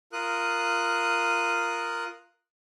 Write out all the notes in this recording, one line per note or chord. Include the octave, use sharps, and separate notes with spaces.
F4 A#4 D#6 F#6